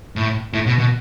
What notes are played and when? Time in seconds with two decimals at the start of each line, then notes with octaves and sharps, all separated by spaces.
0.16 A2
0.53 A2
0.67 B2
0.79 B2